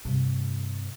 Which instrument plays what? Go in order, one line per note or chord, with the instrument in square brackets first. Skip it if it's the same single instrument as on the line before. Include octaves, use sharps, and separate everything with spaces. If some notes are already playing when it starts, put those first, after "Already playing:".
[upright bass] G2 C3